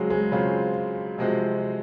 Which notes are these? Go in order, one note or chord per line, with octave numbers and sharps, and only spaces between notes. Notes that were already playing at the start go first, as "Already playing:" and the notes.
Already playing: C#3 F#3 G#3 C4 F4
G#3
C#3 F#3 C4 F4
C3 F3 G#3 C4 F#4